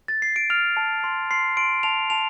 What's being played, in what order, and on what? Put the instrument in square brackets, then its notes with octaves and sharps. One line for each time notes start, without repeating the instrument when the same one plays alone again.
[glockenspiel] A6
C7
D7
F6 F7
A5
C6
C6 C7
C6 D7
A5 F7
A5 F7